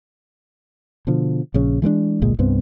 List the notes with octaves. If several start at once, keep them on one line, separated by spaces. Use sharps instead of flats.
B2 D3 F3
A#1 C#3 C#4
E3 G#3 A3 D4
G1 C2 A#2 G#3
C2 G2 B3 C4